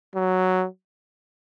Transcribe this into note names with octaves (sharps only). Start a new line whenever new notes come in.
F#3